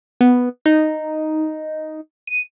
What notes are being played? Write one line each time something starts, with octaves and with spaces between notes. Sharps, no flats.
B3
D#4
D#7